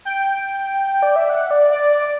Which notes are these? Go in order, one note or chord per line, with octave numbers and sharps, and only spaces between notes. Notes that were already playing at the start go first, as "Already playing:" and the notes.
G5
D5
E5
F#5
D5
D5
D5